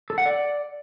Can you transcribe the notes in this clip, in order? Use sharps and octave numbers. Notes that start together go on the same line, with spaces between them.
A4
F#5
D5